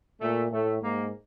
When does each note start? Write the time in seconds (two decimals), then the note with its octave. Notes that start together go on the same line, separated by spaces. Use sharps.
0.20 A#2 A3
0.52 A2 A3
0.82 G#2 A#3